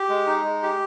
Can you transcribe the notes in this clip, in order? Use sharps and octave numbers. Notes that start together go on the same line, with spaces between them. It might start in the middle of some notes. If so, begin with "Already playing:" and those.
Already playing: G4
G#3
D#4
G#3
G4